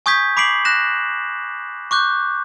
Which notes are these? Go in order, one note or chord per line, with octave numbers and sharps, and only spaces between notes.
G#5 C#6 D#6 G6 G#6 B6
B5 D6 B6 C7 D7 F#7
F#6 A#6 E7
C#6 D6 F#6 G6